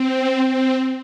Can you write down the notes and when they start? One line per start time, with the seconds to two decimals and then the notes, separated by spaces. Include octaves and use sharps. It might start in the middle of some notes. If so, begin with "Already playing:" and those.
Already playing: C4
0.46 C4